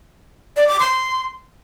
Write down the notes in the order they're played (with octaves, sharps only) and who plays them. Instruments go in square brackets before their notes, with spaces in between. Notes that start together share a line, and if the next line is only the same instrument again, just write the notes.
[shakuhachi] D5
D6
C6